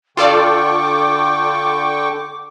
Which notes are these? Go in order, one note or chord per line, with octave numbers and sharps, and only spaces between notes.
D3 F4 A4 D5 G5 C#6 D6